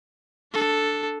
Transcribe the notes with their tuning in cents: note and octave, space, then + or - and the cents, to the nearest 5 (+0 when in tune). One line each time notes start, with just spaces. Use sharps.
D4 +0 A4 +0